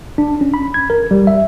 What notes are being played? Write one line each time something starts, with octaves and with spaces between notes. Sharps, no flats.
D4
C#4
B5
G#6
A#4
G3
E5